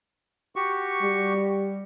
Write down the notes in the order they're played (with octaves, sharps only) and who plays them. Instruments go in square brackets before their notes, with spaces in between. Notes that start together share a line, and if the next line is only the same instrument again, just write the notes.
[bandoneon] F#4 G4 C#6
[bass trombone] G3